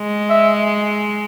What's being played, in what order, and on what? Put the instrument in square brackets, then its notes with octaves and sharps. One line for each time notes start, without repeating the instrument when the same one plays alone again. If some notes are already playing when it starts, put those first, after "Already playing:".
Already playing: [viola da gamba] G#3
[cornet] E5